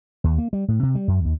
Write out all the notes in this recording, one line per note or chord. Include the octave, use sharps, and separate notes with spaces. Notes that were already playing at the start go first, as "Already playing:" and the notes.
D#2
A#3
G3
A2
C3
G3
F#2
D#2